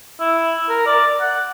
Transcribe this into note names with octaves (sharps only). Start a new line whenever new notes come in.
E4
A#4
D5
F#5